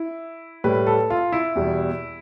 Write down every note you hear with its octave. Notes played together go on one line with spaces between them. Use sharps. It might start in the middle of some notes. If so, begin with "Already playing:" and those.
Already playing: E4
A2 G3 B4
A4
F4
E4
E2 B2 G3